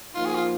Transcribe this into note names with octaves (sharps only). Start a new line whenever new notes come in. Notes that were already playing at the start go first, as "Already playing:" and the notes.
F3 A#3 D#4 F4
G#4
F4